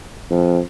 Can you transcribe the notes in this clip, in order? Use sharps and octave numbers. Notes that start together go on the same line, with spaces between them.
F2